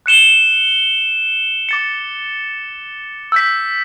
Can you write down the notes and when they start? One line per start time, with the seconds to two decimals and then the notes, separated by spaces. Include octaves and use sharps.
0.06 F#6 C#7 E7 G7
1.69 D6 A6 C#7
3.32 E6 G6 B6